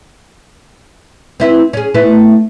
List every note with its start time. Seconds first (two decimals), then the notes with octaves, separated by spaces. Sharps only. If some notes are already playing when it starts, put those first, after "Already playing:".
1.40 C4 E4 B4
1.73 C#4 G#4
1.94 A3 B3 E4